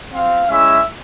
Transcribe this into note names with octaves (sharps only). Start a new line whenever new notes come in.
C4 F4 F5
G#3 C#4 E4 E5